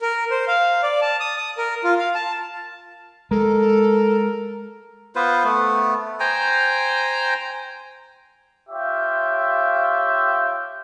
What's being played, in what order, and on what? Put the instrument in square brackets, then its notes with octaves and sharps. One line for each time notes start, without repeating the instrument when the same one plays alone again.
[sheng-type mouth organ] A#4
C5
F5
D5
A5
D#6
D#6
A#4
F4
F5
A5
[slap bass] G#3 [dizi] A4 [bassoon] A#4
[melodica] B3 F4 B4 C5
A3 B3
C5 G5 G#5 A#5
[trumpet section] F4 G4 C#5 E5 F5 G5